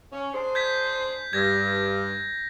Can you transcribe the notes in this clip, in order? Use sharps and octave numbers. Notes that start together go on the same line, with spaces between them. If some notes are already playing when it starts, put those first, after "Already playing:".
C#4
D4 G#4 C5
G6 G#6 B6
G2 G#6 A#6